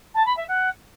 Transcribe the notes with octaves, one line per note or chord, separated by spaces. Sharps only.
A5
B5
E5
F#5